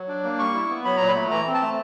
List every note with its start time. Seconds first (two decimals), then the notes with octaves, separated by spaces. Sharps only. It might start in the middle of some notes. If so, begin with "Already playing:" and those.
Already playing: F#3
0.08 D4
0.24 A#3
0.39 G3 C#6
0.54 E4
0.69 B3
0.85 F#3 B5
0.97 A#2 A#5
1.08 B5
1.15 A3
1.31 E3 A#5
1.46 C4
1.54 A5
1.62 A3